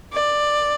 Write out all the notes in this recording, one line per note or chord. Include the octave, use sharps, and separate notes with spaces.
D5